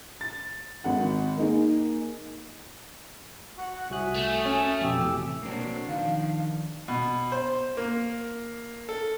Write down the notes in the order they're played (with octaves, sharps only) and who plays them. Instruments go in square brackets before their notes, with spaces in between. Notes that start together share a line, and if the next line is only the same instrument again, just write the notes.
[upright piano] A6
G#1 F#5
A#3 D#4 G#4
[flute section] F#4 F#5
[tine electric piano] C2 F#4 F#6 [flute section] E5 G#5 D#6
[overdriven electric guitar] A3
[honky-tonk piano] C#4
[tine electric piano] F2 B2 [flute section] G4 E6
[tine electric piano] A1 A2 C3
[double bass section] B2 F#3 [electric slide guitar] A#3 C4 [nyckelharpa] D4
[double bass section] B2 F3 [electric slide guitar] D#3 [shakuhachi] F5
[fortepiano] B2
C5
A#3
A4